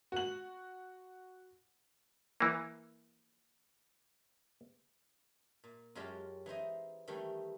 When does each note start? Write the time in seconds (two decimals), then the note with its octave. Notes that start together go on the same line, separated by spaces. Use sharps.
0.12 F#4 F#7
2.41 E3 A#3
5.64 A#2
5.95 F#2 G#3 C#4 F4 G4 A5
6.46 E3 D#4 C5 D#5
7.08 D#3 E3 G3 A3 D#4